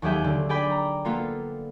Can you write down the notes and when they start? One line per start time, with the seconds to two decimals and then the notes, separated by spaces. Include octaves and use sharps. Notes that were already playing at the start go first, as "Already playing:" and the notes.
0.02 D#2 F#3 G4 G#4 E5 G6
0.24 D3
0.49 G#4 D5 G5 B5
0.71 A#5
1.05 A#3 B3 F4 A4